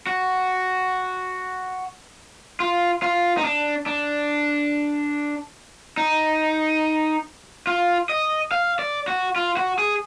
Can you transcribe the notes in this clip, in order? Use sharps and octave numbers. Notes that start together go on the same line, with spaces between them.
F#4
F4
F4
D#4
D4
D4
D#4
F4
D#5
F5
D5
F#4
F4
F#4
G#4